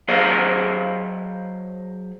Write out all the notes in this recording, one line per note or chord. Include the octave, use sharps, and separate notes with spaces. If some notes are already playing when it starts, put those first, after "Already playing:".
F#3 G#4 C5 D#5 F5